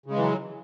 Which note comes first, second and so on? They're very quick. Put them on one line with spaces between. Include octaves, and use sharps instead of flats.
C#3 G#3 E3 F#3